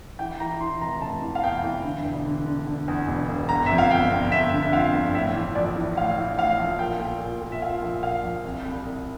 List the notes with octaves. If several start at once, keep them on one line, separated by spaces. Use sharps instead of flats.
E3 G5
E3 A#5
E3 C6
F1 A#5
F1 A5
E3
F5
E2 G5
E3
D3
E1
D3
D3
D3
E2
E1
E1
G1 A#5
F2 E5
F5
G1 G5
G1
G1 E5
D3
E5
F2 F5
G1
A2 E5
E3
A#1 D5
E3
A2 F5
E3
A2 F5
A#1
A#2 G5
A#2
A#2
A#2
E5
A#2 F5
A#1
A#2 F5
A#1
C2
C2
C2